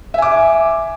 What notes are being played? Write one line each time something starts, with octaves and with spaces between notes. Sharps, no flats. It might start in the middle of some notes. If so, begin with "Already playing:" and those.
E5 G#5 D6